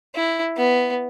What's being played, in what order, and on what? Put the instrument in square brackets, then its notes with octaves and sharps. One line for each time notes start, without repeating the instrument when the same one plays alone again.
[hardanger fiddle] E4
B3